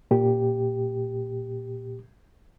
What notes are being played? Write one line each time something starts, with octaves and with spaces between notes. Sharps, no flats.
A#2 G4